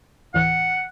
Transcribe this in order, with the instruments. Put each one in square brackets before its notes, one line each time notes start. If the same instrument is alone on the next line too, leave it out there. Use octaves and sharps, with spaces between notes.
[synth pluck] D2 A2 E3 [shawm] F#5